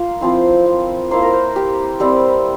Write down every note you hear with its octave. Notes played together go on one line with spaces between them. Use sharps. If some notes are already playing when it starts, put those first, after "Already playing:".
Already playing: A#3 F4 F5
F3 C4 E4
F5
A#3 E4 C5
A#4
C5
G4
G3 C4 E4